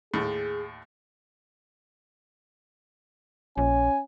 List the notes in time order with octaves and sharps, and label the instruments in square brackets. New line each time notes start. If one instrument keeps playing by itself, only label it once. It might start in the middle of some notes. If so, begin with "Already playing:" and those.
[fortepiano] D#2 A2 [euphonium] G#4
[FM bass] A#1 [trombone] C#4 [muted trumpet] G#5